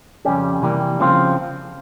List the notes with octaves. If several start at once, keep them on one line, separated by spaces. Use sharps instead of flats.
F2 C#3 G3 C#4 G4
C3 E3 G3 A#3
C#3 F3 C4 F4